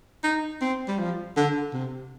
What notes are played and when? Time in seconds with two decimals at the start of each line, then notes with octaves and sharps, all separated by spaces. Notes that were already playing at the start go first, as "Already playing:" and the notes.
0.24 D#4
0.61 C4
0.88 G3
0.99 F3
1.37 D3
1.73 C3